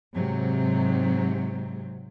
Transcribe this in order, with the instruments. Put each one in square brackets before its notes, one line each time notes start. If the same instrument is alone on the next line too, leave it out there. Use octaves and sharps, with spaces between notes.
[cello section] G#2 C3 F#3